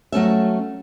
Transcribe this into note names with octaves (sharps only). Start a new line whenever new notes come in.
F#3 A3 C#4 E5